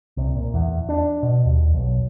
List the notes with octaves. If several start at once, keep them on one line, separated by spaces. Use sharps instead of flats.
C2
A#2
E2
D4
B2
D#2
B1